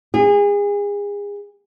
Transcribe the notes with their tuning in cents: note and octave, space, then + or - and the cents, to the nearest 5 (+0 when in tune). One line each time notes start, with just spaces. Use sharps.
G#4 -30